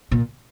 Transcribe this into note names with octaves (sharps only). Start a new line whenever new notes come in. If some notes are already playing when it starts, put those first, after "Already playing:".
A#2